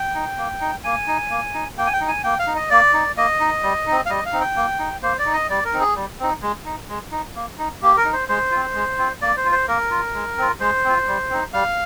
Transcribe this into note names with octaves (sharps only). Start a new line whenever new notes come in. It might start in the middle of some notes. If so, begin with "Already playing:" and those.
Already playing: G5
D#4
A#3
D#4
A#3 G#5
D#4
A#3
D#4
A#3 G5
G#5
G5
D#4
G#5
A#3 G5
F5
D#4
D#5
A#3 D5
D#4
A#3 D#5
D#4
G3
C4 D#4
F5
G3 D#5
F5
C4 D#4
G5
A#3
D#4
A#3 C5
D5
D#4
D#5
G3 D5
A#4
C4 D#4
G#4
G3
C4 D#4
G#3
D#4
G#3
D#4
A#3
D#4
A#3 G4
A#4
D#4
C5
G#3 C5
C4 F4
G#3
C4 F4
A#3 D5
C5
F4
C5
A#3 A#4
F4
G#3
C4 F4
G#3 C5
C4 F4
G3
C4 D#4
G3 F5